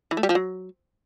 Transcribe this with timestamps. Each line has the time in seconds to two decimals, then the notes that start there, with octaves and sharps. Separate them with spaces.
0.11 E3
0.17 A3
0.23 G3
0.29 F3
0.35 F#3